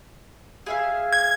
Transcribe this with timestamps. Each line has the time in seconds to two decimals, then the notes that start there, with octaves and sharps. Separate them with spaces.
0.66 G#4 E5 F5
1.13 G#6